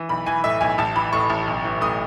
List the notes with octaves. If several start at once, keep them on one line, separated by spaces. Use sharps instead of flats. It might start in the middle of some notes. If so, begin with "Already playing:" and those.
Already playing: E3
B1 B5
E3 G#5
A2 E5
B1 G#5
A1 A5
E3 B5
A2 C#6
A1
B1
E3
A2 D#6